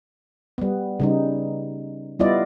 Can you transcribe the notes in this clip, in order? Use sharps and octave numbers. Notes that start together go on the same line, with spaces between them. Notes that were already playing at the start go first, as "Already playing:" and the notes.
G3 B3
C#3 G3 D#4
G3 B3 E4 F4 D5 D#5